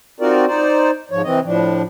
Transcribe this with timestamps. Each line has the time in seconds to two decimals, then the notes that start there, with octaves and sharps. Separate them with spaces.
0.20 C4 D#4 F4 F#4 A#4 D5
0.47 D#4 C5 D5
1.11 G#2 F3 C#5
1.24 C3 E3 C4 D#5
1.44 A2 F3 D4